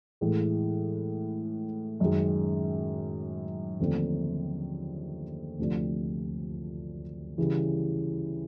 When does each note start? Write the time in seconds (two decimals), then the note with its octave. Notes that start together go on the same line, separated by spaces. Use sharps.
0.21 A2 E3 G#3
2.00 F#2 D#3 G#3
3.79 D#2 D3 F3 A3 C4
5.59 D2 C3 F3 A3 D4
7.38 C#3 E3 G3